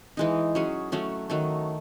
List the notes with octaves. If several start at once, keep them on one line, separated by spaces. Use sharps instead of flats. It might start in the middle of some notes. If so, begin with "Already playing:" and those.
E3 G#3 D#4
F#3 C#4 G#4
F#3 A3 C#4
D#3 F#3 A3